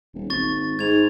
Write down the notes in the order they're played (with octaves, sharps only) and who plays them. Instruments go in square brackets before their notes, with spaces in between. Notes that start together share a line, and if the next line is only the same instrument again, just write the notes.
[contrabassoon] D#1
[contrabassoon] G#1 [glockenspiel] C#6 A6
[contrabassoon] G#2 [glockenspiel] G#6 F7